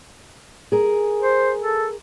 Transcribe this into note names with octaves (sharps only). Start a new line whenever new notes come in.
G#4 A#4
C5
A4